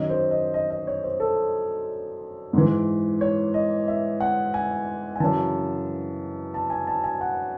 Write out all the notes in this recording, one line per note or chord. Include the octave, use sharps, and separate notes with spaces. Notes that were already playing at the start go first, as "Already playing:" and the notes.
Already playing: F#2 D#3 D#5
C5
D#5
D#5
D#5
C#5
C5
A4
G#2 E3
C#5
D#5
E5
F#5
G#5
G#5
F#2 C#3 E3 A5
A5
G#5
A5
G#5
F#5